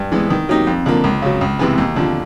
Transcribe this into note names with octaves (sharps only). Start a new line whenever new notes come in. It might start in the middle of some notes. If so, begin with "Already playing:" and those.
Already playing: G2
E3 G#3 B3
D#3
F#3 A#3 D#4 G4
F2
D3 F3 A#3
C#2
C#3 F#3
C#2
C3 E3 G#3 B3
D#2
D3 F3